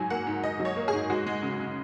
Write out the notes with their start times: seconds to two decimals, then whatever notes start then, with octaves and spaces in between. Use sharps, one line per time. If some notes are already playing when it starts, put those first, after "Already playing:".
Already playing: G#2 F#3 G#5
0.10 A#3 F#5
0.27 G#2
0.43 G#2 D#5
0.60 F#3
0.65 C#5
0.76 A#3
0.88 G#4
0.93 G#2
1.10 G#3 F#4
1.26 G#3
1.43 C#3
1.60 C#3